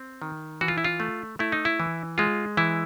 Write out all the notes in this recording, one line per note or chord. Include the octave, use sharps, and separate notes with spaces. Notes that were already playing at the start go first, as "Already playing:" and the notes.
Already playing: C4
D#3
E3 F#4
F4
E4
F4
A3
A3 E4
D#4
E4
E3
G#3 F4
E3 E4